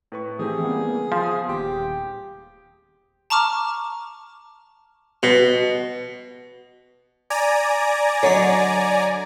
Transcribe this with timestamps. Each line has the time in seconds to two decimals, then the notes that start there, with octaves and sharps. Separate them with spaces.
0.12 A2 B4 C#6
0.39 E3 A3 C4 G4 G#4
0.64 C#3 G3 A#3 B3
1.12 F3 C5
1.49 D#1 G4 C6
3.30 A5 A#5 C#6 D6 F6
5.23 B2
7.30 D5 G#5 A#5
8.23 D3 F#3 D#4 C#5